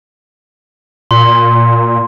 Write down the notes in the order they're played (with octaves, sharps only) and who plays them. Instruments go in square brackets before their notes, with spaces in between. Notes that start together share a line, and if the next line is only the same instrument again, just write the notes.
[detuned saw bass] A#2 [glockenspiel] C6